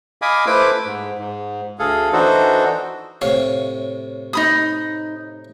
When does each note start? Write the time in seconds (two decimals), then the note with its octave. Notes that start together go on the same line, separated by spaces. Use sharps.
0.22 D#5 F5 G#5 B5 D6 D#6
0.46 A3 E4 B4 C5 B5 D6
0.86 G#2
1.18 G#2
1.79 D2 G#4 A4 F5
2.13 E3 D4 D#4 F#4 A4 C5
3.21 A2 C3 C#5 F5
4.33 D#4 B5 D#6